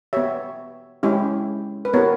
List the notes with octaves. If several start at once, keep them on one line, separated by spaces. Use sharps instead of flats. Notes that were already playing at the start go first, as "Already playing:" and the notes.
B3 G4 C#5 E5
G#3 C#4 E4 G4
B4
B3 E4 G4 A#4 C#5